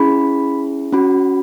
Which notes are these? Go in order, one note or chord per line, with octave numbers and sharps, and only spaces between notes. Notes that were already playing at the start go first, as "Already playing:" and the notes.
Already playing: C#4 E4 G#4 B5
C#4 F#4 B5